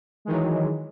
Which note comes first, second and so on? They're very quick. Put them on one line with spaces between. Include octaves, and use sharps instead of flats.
G#3 D#3 E3 F#3